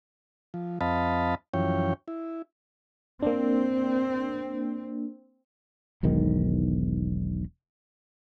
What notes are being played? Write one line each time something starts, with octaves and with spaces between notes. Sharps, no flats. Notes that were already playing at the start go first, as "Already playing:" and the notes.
F3
F2 C4 D#5 F5 A5 B5
F#2 E3 F3 C#4 C#5 G5
E4
A#3 C4 D4
E1 B1 G#2 D#3